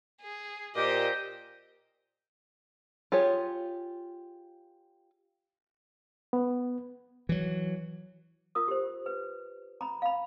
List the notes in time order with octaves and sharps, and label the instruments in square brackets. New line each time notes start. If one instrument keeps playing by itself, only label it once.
[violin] G#4
[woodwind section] A#2 G4 [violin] C5 D#5
[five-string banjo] F4 G4 G#4 C#5
[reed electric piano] B3
[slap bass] E3 F#3
[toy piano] F4 A#4 D#6
G4 C5
B4
A#5 B5
F5 B5